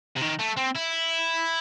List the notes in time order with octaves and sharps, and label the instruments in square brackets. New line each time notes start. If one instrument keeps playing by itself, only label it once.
[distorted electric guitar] C3
D#3
A3
C4
E4